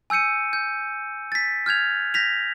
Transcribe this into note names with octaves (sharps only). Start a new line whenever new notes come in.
G#5 E6 G6 C#7 D#7
G6
A6 B6
F6 G6 G#6 F7
G6 A#6 B6 F7